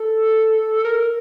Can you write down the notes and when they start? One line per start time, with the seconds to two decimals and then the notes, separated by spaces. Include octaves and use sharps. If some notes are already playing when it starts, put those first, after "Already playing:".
Already playing: A4
0.85 A#4